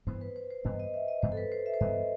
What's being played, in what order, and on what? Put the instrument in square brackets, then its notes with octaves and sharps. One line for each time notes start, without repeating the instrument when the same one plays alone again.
[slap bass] G2 E3 B3 [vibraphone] C5
[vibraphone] B4
C5
C5
[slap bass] G2 E3 B3 [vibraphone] D#5
[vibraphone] D#5
E5
D#5
[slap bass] G2 E3 B3 [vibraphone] C5
[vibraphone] A4
B4
C5
E5
C5
[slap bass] G2 E3 B3 [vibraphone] D#5